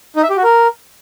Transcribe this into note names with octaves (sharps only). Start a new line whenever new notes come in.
D#4
E5
G4
F#4
A#4